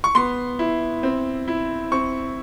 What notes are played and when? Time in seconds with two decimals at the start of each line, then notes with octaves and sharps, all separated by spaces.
0.04 C#6
0.15 B3 C6
0.59 E4
1.03 C4
1.48 E4
1.92 C4 C#6